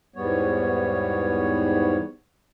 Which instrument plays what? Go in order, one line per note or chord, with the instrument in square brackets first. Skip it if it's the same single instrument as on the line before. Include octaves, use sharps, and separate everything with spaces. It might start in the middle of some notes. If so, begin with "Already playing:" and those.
[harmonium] E2 G#2 G3 B3 C#5